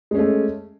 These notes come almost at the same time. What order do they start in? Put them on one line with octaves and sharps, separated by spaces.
G#3 C#4 A3